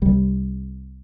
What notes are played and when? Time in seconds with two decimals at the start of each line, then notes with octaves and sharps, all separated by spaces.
0.02 C2 C3 G3